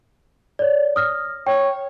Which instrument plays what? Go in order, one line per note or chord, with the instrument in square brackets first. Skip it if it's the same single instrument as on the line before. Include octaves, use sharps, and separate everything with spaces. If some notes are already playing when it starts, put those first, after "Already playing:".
[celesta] C#5 D5
D#6 F6 A#6
[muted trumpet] C#5 [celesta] G5